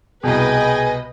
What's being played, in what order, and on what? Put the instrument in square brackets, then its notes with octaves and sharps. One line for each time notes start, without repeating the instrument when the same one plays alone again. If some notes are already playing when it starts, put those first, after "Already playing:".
[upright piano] C2 B2 [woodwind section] G#4 G5 G#5 [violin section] B4 D#5